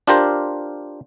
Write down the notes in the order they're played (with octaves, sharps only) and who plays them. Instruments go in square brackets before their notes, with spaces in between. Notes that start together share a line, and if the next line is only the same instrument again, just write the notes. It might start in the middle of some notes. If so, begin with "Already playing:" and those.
[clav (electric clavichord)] D4 F4 G4 A#4 C5